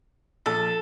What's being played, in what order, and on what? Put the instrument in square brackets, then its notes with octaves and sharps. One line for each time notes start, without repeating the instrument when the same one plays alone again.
[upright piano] A#1 [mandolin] A4